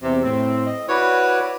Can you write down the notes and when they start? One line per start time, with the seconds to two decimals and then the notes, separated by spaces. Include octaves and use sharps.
0.03 E2 C3
0.23 A2 C4
0.66 D#5
0.89 E4 F#4 B4 C#5 D5